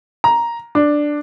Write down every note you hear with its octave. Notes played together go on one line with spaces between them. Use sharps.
A#5
D4